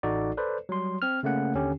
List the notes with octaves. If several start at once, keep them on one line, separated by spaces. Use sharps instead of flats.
A1 D#4 F#4 A4 D5
A4 B4 C5 D5
F#3 G3 C6
C4 F6
C#3 A3 A#3 C#4 F#5
D#2 D3 C#4 G4